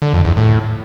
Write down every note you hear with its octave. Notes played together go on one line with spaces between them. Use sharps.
D3
F2
E2
A2